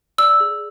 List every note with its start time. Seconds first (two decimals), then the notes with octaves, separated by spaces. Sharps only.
0.18 D5 E6
0.40 G#4